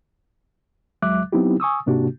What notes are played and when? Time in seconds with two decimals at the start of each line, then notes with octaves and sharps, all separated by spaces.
1.02 D#2 F#3 G#3 E5 D6 F#6
1.32 F#3 B3 C4 D#4 E4 G4
1.60 G#5 C#6 D#6 E6
1.86 G#2 C3 A#3 D4 F#4 G4